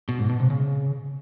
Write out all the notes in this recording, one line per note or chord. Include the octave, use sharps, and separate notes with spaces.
B2
G#2
B2
C3
C#3